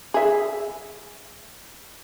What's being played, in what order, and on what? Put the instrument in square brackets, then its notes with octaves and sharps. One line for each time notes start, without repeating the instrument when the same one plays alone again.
[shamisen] G#4 E5